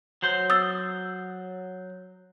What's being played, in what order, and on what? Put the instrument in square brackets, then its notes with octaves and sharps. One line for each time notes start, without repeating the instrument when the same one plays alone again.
[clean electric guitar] F#3 C5
[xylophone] D#6 E6 A6